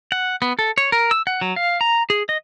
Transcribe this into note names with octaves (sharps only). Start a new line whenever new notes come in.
F#5
B3
A4
C#5
A#4
E6
F#5
F#3
F5
A#5
G#4
D#5